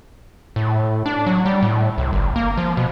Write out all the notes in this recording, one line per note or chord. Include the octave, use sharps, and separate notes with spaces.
A2
D4
F#3
G3
A2
C2
G1
A#3
F3
B2